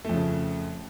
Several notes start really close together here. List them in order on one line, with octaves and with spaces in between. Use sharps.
A3 F2 C#3